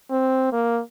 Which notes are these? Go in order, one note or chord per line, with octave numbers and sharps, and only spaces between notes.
C4
A#3